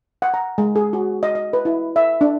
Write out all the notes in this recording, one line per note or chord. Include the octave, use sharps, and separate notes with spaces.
F#5
A#5
G#3
G#4
F#4
D#5
D#5
B4
E4
E5
D4